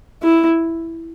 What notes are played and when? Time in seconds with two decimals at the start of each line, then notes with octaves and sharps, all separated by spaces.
0.22 E4